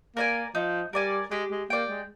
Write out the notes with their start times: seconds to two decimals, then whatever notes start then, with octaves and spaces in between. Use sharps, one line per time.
0.16 A#3 A#4 D5 G#5
0.55 F3 D#4
0.93 G3 A#4 D5 G#5
1.31 G#3 G4
1.51 G#3
1.70 A#3 D5 G5
1.89 G#3